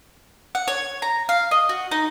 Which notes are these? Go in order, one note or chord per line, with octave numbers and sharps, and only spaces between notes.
F#5
C#5
A#5
F5
D#5
F#4
D#4